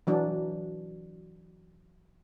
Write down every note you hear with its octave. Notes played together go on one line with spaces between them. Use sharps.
E3 F#3 D4